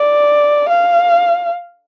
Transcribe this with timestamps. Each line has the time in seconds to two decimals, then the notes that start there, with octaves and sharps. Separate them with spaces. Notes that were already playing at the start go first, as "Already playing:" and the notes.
Already playing: D5
0.69 F5